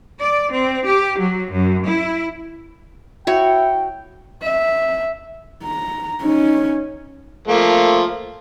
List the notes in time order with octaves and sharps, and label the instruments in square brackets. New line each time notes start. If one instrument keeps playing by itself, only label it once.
[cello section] D5
C4
G4
F#3
F#2
E4
[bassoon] E4 [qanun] F#4 C#5 [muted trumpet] G5
[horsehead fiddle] E5
A#5
C#4 D#4
[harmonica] F3 A3 A#3